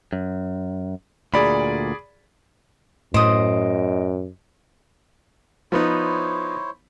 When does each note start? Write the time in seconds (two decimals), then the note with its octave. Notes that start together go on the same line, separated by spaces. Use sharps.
0.13 F#2
1.34 D2 A#2 G#4 D5 B5
3.14 F#2 A2 C5 D#5 D#6 D7
5.72 F3 B3 D#4 E4 C5 C#5